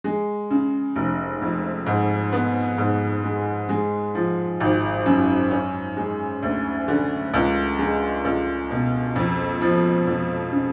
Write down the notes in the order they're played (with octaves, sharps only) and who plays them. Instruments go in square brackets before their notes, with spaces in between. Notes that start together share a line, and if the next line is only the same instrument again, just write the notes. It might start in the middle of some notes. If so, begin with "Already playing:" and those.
[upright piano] G#3
C#3
F1
F2
G#2
B3
G#2
G#3
G#3
F3
G#1
F#2
C#4
G#3
D2
D3
C#2
G#3
C#2
B2
F2
F3
F2
C#3